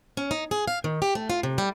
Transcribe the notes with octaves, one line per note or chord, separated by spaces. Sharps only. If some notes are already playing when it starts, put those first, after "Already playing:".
C#4
D#4
G#4
F5
D#3
G4
A3
F4
C3
G3